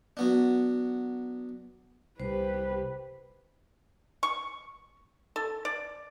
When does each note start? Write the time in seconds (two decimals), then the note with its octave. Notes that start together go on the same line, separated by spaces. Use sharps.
0.17 F#3 B3 D4
2.20 C2 G4 B4 C5
4.23 C#6
5.36 A4
5.65 D5